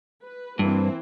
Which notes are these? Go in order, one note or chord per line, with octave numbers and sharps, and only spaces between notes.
B4
G2 E3 A#3 C4